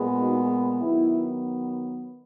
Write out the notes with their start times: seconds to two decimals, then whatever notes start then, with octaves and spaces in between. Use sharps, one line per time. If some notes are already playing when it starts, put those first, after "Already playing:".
Already playing: A#2 G#3 B3
0.18 D#4 F#4
0.82 D#3 F#3 B3 E4